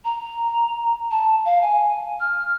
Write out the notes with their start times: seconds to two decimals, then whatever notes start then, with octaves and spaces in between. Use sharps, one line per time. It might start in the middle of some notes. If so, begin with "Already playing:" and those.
0.05 A#5
1.11 A5
1.45 F5
1.62 G#5
2.20 F6